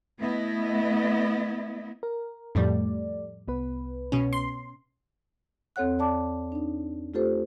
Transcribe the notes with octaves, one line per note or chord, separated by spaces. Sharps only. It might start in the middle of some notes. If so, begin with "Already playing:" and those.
A3 B3 E4 D#5
A#4
F2 A2 G3 A3 D5
C2 B3 B4
B2 C#4
C6
E2 C4 A4 C#5 F#5 F#6
D5 A5 D6
D4 D#4
A3 F4 G4 A4 C5